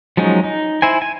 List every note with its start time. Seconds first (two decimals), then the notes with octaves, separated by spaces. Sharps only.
0.17 F3 F#3 G#3 C#4 D#4
0.44 D#4
0.82 E4 C5 G#5
1.02 G#5